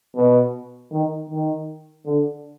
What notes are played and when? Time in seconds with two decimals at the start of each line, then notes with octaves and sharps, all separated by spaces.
0.15 B2
0.91 D#3
1.30 D#3
2.05 D3